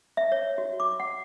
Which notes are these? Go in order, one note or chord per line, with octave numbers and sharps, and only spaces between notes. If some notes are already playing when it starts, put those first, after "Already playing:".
E5
C#5
F#4
D6
F#5